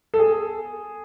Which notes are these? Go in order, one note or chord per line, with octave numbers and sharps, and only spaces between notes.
A4
G#4